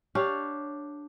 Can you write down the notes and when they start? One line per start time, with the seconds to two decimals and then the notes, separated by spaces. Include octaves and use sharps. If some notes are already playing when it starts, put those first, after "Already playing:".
0.15 D4 G4 C#5 F5